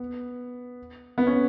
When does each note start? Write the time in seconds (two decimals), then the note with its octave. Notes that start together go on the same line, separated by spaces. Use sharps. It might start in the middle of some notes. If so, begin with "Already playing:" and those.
Already playing: B3
1.18 B3
1.27 C#4